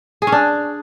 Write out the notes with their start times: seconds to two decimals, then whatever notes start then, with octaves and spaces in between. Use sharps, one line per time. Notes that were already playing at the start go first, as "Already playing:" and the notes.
0.22 G#4
0.27 C#4
0.32 D4